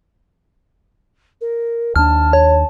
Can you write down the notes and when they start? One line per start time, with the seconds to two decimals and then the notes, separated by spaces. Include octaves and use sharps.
1.41 A#4
1.96 D#2 D4 A5 F6
2.33 C#5